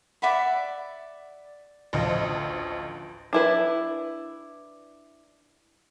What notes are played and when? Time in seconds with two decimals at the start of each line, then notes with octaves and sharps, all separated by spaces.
0.22 D5 E5 F#5 B5
1.93 A1 D2 F3 D#5
3.33 D4 E4 B4